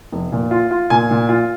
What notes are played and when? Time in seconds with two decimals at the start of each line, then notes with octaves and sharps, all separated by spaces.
0.12 F1
0.32 A#2
0.51 F4
0.71 F4
0.90 A#2 G#5
1.11 A#2
1.29 F4